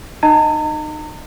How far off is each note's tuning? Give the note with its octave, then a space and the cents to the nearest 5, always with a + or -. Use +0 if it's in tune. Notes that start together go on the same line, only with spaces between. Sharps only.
D#4 -30 D#5 +0 A#5 -40